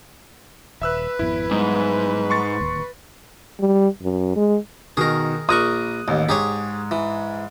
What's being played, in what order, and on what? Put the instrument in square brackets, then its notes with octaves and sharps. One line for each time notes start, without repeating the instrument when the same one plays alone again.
[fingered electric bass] D#1 [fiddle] B4 [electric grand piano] E5 E6 F#6
[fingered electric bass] G#1 F2 B3 [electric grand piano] E4
[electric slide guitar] G#2 [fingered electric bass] F#3 G3 B3
[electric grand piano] C6 C#6 A6
[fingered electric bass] D1 D#2
[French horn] G3
F#2
G#3
[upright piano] B2 D#3 [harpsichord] G#4 A#4
[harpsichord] A#1 A#4 C#6 [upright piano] D#6 F#6
[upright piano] A1 [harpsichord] D#2
[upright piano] G#2 [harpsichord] G4 G#4 C#5
[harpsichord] E3